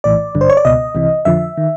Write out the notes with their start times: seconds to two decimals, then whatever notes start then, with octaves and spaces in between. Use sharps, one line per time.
0.04 A#1 A2 E3 D5
0.35 G#1 G2 D3
0.41 C5
0.50 C#5
0.57 D5
0.65 C#2 B2 D#5
0.95 C2 C3 E3
1.25 F2 D3 F3 E5
1.57 D#3